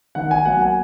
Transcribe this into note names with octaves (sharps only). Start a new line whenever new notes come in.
D#3 F#5
G#5
F#3 A#3 F#5
G#5